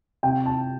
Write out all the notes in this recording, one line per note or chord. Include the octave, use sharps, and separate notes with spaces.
C3 G5
A5